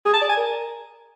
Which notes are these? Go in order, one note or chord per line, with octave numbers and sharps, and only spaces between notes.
G#4
A5
D5
G#5
A#4